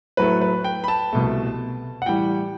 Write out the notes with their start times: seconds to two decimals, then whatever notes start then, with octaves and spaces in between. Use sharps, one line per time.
0.17 A2 F#3 A3 B4
0.41 B4
0.64 G5
0.84 B5
0.88 A5
1.12 C2 B2 A3
2.02 F#5
2.06 A2 E3 G3 G5